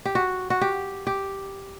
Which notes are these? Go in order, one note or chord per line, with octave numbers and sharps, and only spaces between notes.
G4
F#4
F#4
G4
G4